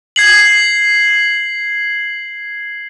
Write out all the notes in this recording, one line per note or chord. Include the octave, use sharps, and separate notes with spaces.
G#6 C7 F#7